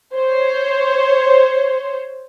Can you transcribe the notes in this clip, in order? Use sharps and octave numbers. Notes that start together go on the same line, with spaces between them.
C5 C#5